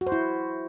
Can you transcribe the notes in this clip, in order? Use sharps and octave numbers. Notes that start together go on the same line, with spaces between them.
F#4
C5
E4